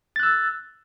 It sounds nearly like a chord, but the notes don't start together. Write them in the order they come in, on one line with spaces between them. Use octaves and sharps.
A6 F#6 E6